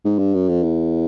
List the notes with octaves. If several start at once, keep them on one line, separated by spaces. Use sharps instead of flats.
G#2
G2
F#2
F2
E2